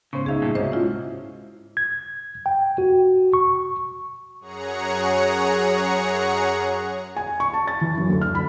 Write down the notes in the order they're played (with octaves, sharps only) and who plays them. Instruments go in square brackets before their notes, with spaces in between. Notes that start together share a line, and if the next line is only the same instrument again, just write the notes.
[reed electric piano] G#2 C5 C#6 [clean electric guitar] C#3 [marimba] B3 C#4
[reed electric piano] C#2 D#4 E5 [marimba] G#4 F5
[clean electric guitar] G2 A#2
[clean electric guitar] G#2 [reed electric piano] C3 C#4 F#4 [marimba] C5 D#5 E5
[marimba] E4 F4
[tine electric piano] G#6
G5
F#4
C#6
[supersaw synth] F#2 G#4 C#5 F#5 A#5 C#7
[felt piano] G#5
C#6
A5
A6
E3
F#2
D2
F6
B5